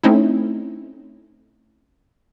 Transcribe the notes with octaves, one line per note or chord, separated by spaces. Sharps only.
A3 C4 C#4 D#4 E4